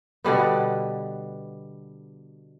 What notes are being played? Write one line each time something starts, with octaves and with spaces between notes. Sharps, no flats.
B2 D3 G3 B3